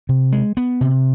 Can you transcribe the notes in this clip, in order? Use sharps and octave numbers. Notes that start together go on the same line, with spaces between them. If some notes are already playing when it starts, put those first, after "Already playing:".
C3
G#3
B3
C3